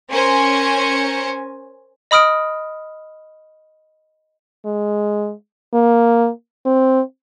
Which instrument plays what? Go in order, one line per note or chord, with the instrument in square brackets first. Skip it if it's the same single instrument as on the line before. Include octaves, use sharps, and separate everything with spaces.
[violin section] C#4 A#4 C5 G#5 C#7
[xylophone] D#5 B5 D#6 F6 D7
[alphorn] G#3
A#3
C4